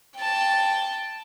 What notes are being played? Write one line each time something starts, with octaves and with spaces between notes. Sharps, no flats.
G5 A5